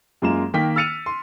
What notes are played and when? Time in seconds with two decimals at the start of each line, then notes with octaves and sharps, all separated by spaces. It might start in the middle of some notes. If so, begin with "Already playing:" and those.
0.22 F#2 G#3 A#3 F4 A#5 E7
0.54 D#3 A#3 G5 B6
0.76 E6 F6 A6 C#7 D#7 F7
1.06 C6